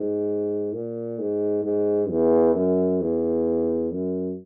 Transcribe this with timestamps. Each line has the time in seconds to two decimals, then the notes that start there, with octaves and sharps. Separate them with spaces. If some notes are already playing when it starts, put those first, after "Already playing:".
Already playing: G#2
0.73 A#2
1.19 G#2
1.64 G#2
2.10 E2
2.55 F#2
3.01 E2
3.93 F#2